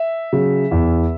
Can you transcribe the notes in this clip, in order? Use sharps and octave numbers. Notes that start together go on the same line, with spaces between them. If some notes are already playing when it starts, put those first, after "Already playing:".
Already playing: E5
C#3 F#3
E2